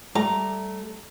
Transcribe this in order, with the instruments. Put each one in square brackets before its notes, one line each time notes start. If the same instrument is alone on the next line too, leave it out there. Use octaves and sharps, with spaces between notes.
[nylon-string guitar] G3 A3 [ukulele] A#5